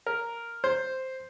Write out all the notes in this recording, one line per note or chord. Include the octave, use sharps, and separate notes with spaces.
A#4
C5